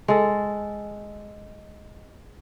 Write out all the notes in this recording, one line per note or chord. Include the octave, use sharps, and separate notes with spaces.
G#3 A4